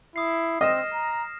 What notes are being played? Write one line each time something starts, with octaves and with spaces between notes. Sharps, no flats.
E4 D#6 C7
C4 D#5 F6 A#6 E7
A#5